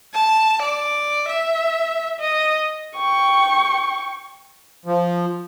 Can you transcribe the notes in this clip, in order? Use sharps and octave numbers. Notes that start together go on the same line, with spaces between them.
A5
D5
E5
D#5
G5 C#6
F3